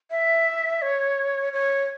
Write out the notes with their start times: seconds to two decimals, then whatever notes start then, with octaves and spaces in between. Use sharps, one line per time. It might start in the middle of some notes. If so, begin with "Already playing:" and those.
0.11 E5
0.82 C#5
1.53 C#5